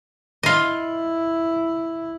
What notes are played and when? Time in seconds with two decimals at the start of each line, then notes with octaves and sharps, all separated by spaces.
0.43 E4 F4 D#5